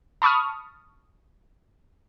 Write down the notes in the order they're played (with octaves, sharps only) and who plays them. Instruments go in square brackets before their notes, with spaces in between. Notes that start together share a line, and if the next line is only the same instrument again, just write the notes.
[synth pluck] A5 B5 C#6 D#6 F6